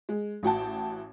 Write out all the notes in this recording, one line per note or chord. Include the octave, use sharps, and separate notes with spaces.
G#3
A1 F#4 G5 A5